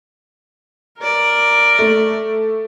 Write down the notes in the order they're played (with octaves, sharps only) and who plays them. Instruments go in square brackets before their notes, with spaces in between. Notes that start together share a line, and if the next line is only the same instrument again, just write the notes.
[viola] A#4 D5
[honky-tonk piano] A3